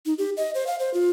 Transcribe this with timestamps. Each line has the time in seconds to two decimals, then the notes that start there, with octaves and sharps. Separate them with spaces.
0.06 D#4
0.18 G4
0.37 D#5
0.55 C5
0.67 F5
0.80 C5
0.94 F4